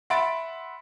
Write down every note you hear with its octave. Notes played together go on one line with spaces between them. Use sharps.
E5 F#5 B5 C6 A6 D7